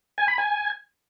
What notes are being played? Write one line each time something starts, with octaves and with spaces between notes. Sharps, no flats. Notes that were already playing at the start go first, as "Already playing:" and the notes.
G#5
B5
G#5